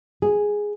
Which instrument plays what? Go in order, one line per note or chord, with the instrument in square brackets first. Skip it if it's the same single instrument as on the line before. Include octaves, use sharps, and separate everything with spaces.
[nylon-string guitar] G#4